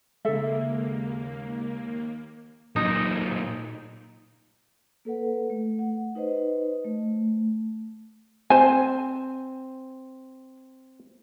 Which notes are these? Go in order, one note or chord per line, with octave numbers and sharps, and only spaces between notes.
D#2 C#3 G#3 A#3 A4 E5
A#2 F#3 D#4
A#3 A4 B4 F#5
A3
F#5
D#4 B4 C5 D#5
A3
C4 C5 G#5